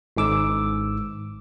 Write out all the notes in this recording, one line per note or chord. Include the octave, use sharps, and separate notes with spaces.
G#1 G#2 D6 E6